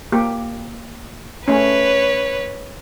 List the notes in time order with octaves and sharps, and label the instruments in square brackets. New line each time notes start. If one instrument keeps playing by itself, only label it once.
[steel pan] A#3 G4
[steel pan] A3 C#4 [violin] B4 C#5